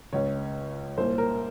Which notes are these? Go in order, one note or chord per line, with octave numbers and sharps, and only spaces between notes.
C#2 C#3 C#5
C2 A#2 C5
A#4